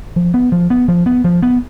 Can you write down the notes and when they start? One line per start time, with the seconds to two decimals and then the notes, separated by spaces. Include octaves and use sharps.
0.16 F3
0.34 B3
0.52 F3
0.70 B3
0.88 F3
1.06 B3
1.24 F3
1.43 B3